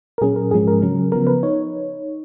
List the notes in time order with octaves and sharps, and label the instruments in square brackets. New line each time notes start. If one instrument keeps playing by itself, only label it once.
[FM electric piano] A#4
A#2 F#3 C#4 G#4
A#4
G#2 F3 G#3 C#4 G#4
A#4
C#3 F#3 C#4
C#3 F3 B3 A#4
B4
D#4 C#5